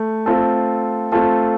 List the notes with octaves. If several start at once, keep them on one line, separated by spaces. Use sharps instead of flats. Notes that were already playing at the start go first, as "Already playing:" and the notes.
Already playing: A3
A3 C4 F4 A4
A3 C4 F4 A4